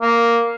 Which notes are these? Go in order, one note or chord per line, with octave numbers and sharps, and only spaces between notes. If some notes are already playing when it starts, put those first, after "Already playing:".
A#3